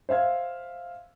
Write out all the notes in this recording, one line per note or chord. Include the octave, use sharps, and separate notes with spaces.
C5 E5 F5 G#6